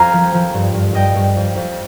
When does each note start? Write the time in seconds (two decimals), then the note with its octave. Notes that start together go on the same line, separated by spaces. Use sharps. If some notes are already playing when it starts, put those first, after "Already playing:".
Already playing: F2 F5 G#5 A#5
0.13 F3
0.34 F3
0.54 G2
0.74 G2
0.93 G2 D#5 G5
1.15 G2
1.36 F2
1.56 F2